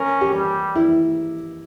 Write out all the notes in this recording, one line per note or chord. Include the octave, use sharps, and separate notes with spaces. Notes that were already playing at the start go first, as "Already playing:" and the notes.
Already playing: C#4 A#4
G4
G3
E4